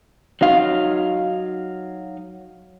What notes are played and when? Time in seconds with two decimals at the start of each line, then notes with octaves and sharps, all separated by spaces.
0.41 F#3 D#4 F5